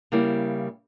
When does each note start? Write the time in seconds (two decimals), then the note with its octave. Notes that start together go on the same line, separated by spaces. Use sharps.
0.12 C#3 G3 A#3 E4